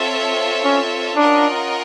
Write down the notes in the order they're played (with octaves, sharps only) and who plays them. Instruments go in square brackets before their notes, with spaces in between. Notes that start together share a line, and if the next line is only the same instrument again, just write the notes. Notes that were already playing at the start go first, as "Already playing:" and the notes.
Already playing: [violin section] C4 F4 A4 C#5 E5
[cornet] C#4
[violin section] C#4 F4 A#4 D#5 F#5 [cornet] D4